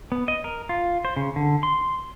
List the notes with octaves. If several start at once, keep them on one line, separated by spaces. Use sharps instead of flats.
B3
D#5
A#4
F4
C5
C#3
D3
C6